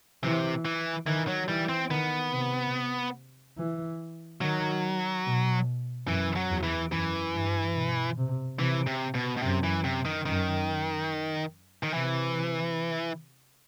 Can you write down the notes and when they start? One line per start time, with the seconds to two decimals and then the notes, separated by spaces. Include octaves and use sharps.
0.23 C3 E3
0.65 E3
1.06 D#3 E3
1.28 F#3
1.48 E3 G3
1.69 C4
1.90 D#3 B3
2.31 C3
3.58 E3
4.41 D#3 F#3
5.25 B2
6.08 F#2 E3
6.36 F#3
6.50 E2
6.63 E3
6.92 F#2 E3
7.34 G2
7.75 B2
8.18 C3
8.59 C3 E3
8.87 C3
9.15 B2
9.37 B2
9.43 F#2 C3
9.64 E3
9.84 C3
10.05 D#3
10.26 F#2 D#3
11.83 D#3
11.93 C3 E3